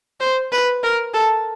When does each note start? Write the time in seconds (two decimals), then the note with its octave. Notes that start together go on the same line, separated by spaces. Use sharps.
0.20 C5
0.52 B4
0.83 A#4
1.14 A4